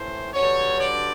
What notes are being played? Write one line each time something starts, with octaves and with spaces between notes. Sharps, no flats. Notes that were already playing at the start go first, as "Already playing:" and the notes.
Already playing: A2 E3 C5
G2 D3 F#3 C#5
D5